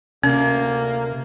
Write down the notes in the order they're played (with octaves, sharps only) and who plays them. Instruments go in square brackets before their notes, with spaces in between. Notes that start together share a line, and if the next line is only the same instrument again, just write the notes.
[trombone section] D2 A#3 [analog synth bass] C3 [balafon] C#4